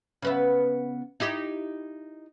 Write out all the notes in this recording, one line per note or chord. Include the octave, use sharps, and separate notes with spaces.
C#3 B3 E5
D#4 E4 G4